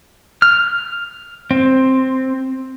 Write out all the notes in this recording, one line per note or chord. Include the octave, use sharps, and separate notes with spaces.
F6
C4